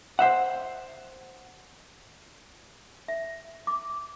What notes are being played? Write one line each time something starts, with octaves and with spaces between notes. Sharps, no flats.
C5 E5 F#5
E5
D6